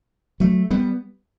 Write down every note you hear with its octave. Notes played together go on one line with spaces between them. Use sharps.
F#3 A3
G3 B3